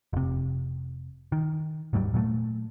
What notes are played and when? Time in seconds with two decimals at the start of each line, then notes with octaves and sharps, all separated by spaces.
0.13 F1 C3
1.32 D#3
1.93 D#1 G#2 F#3 G3
2.14 A#2 F#3 G#3 A3